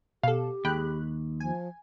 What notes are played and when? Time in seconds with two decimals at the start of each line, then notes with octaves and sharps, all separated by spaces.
0.23 B2 G4 A4 F5
0.65 D#2 G#3 G5 B5 F#6
1.40 F3 G#5